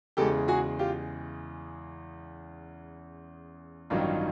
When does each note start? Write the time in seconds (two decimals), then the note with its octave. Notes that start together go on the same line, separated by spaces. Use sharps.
0.17 E2 C#3 E3 G#3 G4 A4
0.48 F#4 G#4
0.79 F4 G4
3.90 A1 G2 D#3 F#3 D#4 F4